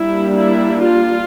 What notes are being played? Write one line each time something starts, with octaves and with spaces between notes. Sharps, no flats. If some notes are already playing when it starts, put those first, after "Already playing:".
Already playing: G3 A#3 D4 E4
E4
F4